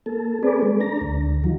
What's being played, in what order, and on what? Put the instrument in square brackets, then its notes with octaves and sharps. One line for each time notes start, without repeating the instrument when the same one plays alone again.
[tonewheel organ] A#3 A4
C4 G#4 A4 B4 D5
G#3
D4 A#5
D2
D#3 F3 F#3